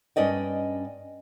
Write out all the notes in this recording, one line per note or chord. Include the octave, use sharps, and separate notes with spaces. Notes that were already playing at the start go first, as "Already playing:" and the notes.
G2 C#4 D5 D#5 G5